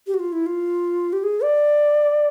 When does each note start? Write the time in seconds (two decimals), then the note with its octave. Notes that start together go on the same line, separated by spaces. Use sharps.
0.07 G4
0.14 F#4
0.19 F4
0.32 E4
0.46 F4
1.13 G4
1.23 G#4
1.43 D5